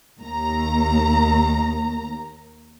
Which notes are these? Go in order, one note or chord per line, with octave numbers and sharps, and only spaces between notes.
D#2 A#5